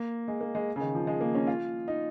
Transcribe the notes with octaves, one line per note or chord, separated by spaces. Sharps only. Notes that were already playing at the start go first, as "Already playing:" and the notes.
Already playing: A#3
G#3
A#3
G#3
C#3
D#3
F3
G#3
A#3
C#4
F4
D#4